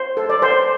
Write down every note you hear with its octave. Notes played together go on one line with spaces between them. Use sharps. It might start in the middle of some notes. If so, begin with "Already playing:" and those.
Already playing: C5
A4
D5
C5